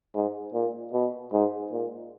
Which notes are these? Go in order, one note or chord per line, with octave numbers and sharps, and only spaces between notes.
G#2
A#2
B2
G#2
A#2